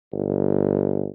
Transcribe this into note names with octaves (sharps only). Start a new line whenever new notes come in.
G1